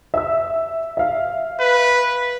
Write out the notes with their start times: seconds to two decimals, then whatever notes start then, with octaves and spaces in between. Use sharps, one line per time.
0.14 E5 E6
0.97 E5 F5
1.60 B4